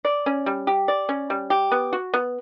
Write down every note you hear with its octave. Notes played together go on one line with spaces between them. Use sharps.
D5
C#4
G3
G4
D5
C#4
G3
G4
B3
F#4
B3